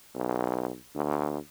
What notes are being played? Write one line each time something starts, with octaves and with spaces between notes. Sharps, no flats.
B1
D2